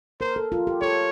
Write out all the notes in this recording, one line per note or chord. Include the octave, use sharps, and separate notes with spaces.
A#4 C5
A4
F4
G4
A4 C#5